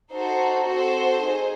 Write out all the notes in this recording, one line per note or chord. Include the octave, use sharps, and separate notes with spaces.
D#4 F#4 A4 C5
C4 F#4 A4 C5
D#4 G#4